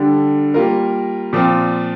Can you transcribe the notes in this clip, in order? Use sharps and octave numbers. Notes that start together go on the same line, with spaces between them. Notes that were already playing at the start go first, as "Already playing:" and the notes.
Already playing: D3 G3 D4 A4
G3 A#3 F4 A#4
A#2 F3 C4